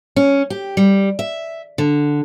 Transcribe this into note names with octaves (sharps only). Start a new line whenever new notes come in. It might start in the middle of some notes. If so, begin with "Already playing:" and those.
C#4
G4
G3
E5
D3